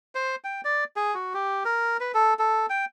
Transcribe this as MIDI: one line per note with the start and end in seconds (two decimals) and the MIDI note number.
0.15 0.35 72
0.44 0.61 79
0.65 0.84 74
0.96 1.14 68
1.15 1.33 66
1.34 1.63 67
1.65 1.97 70
2.00 2.12 71
2.14 2.34 69
2.39 2.66 69
2.70 2.85 79